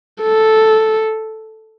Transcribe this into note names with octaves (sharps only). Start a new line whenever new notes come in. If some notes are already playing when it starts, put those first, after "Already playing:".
A4